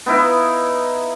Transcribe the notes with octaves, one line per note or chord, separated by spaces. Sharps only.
B3 D#4 E4 F5